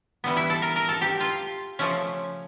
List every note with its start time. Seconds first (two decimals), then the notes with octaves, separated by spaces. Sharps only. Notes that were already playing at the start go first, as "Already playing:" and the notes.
0.24 E3 G3 B3
0.37 E4
0.50 A4
0.62 A#4
0.76 A#4
0.89 A4
1.01 G4
1.20 F4
1.79 C#3 F3 A3 C#4